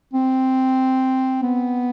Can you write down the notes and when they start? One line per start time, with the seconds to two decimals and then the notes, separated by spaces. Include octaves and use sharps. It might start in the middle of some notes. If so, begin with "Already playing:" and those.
0.13 C4
1.43 B3